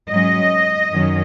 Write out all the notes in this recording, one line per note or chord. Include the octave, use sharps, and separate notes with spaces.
G#2 F#3 C#4 D#5
F#2 D#3 F#3 C#4